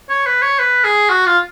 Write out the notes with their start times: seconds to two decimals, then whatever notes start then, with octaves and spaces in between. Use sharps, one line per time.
0.10 C#5
0.26 B4
0.42 C#5
0.59 B4
0.85 G#4
1.10 F#4
1.26 F4